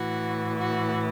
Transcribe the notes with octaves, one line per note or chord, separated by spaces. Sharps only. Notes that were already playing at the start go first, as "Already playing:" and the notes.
Already playing: A2 E3 F#4
F#4